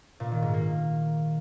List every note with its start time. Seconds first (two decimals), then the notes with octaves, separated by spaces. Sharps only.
0.20 A#2
0.31 D#3
0.42 G#2
0.54 A#3